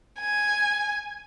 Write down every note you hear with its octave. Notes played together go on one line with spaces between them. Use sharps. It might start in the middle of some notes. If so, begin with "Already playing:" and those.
G#5